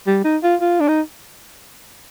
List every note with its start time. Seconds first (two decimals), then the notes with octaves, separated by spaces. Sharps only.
0.07 G3
0.24 D#4
0.43 F4
0.61 F4
0.81 D4
0.88 D#4